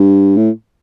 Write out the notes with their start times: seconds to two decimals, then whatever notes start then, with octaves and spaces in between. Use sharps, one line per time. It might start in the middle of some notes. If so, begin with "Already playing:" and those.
Already playing: G2
0.37 A2